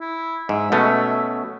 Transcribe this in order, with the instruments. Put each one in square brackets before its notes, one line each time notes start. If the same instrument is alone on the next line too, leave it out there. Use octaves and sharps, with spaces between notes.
[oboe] E4
[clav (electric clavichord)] G#2 [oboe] E5
[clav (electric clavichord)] B2 A3 C#4